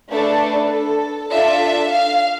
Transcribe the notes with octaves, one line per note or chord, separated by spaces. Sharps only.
A3 D4 A4 B4
A4
D4 F4 A4 E5
F5